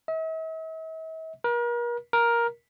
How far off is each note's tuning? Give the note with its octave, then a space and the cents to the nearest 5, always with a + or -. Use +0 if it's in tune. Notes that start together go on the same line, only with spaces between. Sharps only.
E5 -45
A#4 +40
A#4 +10